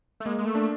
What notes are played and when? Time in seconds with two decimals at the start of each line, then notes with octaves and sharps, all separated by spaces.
0.20 A3
0.26 G#3 A#3
0.39 G#3
0.45 A3
0.55 D4